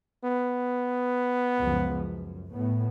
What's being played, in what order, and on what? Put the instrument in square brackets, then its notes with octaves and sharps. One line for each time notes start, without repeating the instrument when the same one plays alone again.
[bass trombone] B3
[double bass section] C#2 F#2 F3
F#2
A2 B3